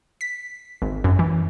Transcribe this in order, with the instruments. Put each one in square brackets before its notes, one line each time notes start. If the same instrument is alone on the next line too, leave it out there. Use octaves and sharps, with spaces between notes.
[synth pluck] B6
G#1
F#2
E3